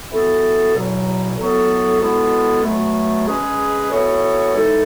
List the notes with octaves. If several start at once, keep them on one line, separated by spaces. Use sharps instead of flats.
E3 B3 F#4 A4
E2 B2 F#3
A2 F#3 B3 F#4 A4
B2 G#3 B3 E4 A4
B2 F#3 A3
G#3 C#4 G#4 B4
E3 B3 F#4 A4 C#5
E3 G#3 D#4 A4